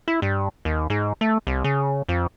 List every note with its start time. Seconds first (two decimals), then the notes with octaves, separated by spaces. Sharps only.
0.08 E4
0.22 G2
0.65 D#2
0.90 G#2
1.21 A3
1.47 C2
1.64 C#3
2.09 F2